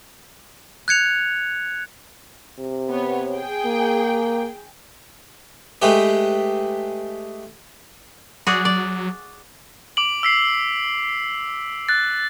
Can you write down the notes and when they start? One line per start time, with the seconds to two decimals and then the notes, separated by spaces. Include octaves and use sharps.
0.88 F#6 G#6 C#7 F7
2.59 C3
2.89 B3 C#5
3.33 G#4 G5
3.65 A#3
5.82 G#3 A3 G4 B4
8.47 F#3 F#4 G#4 D5
8.65 D5
9.97 D6 D7 F#7
10.23 E6 B6 C7
11.89 F#6 A6